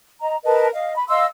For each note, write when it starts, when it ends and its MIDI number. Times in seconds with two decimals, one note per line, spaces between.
0.22 0.37 75
0.22 0.37 82
0.44 0.67 70
0.44 0.67 71
0.44 0.67 75
0.44 0.67 81
0.73 0.95 75
0.73 0.95 77
0.96 1.07 83
1.09 1.26 75
1.09 1.26 77
1.09 1.26 84
1.09 1.26 88